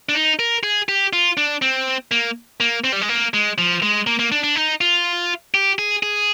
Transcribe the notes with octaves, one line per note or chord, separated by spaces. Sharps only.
D4
D#4
A#4
G#4
G4
F4
D4
C4
A#3
A#3
C4
G3
G#3
A#3
G#3
F3
G#3
A#3
A#3
D4
D4
D#4
F4
G4
G#4
G#4